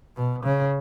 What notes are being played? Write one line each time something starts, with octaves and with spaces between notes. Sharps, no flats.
B2
C#3